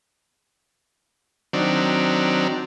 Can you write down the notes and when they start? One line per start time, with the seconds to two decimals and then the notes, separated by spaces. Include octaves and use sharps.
1.53 D#3 F#3 C4 D4